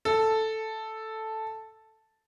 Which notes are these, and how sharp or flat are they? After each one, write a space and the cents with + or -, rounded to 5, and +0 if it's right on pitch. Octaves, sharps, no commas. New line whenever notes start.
A4 +0